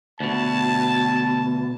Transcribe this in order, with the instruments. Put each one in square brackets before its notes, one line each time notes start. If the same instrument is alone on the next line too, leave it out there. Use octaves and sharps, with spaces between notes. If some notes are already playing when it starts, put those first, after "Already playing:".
[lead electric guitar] D2 B2 [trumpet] A5